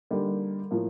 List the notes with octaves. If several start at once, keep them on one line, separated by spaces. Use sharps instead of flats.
D3 G3 A#3 D#4
A2 F3 A#3